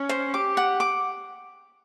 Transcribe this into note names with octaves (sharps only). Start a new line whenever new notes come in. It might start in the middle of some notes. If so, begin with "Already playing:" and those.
Already playing: C#4
C5
G4 D6
F#5
D6